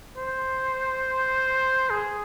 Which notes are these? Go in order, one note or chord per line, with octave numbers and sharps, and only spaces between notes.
C5
G#4